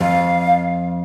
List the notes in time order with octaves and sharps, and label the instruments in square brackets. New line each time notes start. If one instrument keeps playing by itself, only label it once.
[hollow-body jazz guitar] F2 [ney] F5